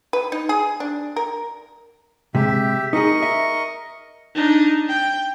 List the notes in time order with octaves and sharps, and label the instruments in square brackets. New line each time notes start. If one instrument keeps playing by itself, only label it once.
[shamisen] B4
D#4
G#4
D4
A#4
[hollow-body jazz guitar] C3 G#3 [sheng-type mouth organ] G4 E5
[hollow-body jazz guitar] D#4 G#4 [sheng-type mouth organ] A#4 D#5 C#6
[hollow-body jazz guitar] E5
[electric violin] D4 D#4
G5